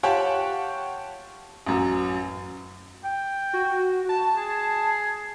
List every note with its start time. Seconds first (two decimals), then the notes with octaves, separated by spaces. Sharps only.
0.03 F4 G4 C#5 F#5 G5 A5
1.67 A1 F#2
3.04 G5
3.53 F#4
4.09 A5
4.35 G#4